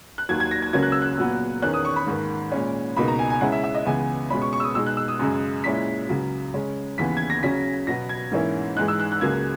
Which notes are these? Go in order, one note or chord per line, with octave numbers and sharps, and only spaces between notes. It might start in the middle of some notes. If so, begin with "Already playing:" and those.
F#6
D#2 D#3 F#3 G#6
G#6
A#6
G#6
C#2 C#3 F#3 A#3 C#4 G#6
F#6
E6
F#6
A#2 F#3 B3
E2 D#3 A#3 C#4 F#6
D#6
C#6
B5
G#2 D#3 A#3
A#2 G#3 C#4
C#2 B2 A#3 D#4 B5
A#5
G#5
G#5
C#3 G#3 C#4 E4 F#5
E5
E5
D#5
C#2 C#3 E3 B3 G#5
B2 G#3 C#4 B5
C#6
C#6
E6
D#6
B2 G#3 D#4 E6
F#6
E6
D#6
F#2 C#3 G#3
A#2 G#3 C#4 E4 B6
C#2 C#3 F#3
C#3 G#3 C#4
D#2 C#3 E3 B3 B6
G#6
A#6
C#3 F#3 C#4 B6
B2 F#3 B3 A#6
G#6
G#2 E3 A#3 C#4 E4
G#2 E3 G#3 D#4 F#6
E6
F#6
F#6
C#2 C#3 F#3 A#3 G#6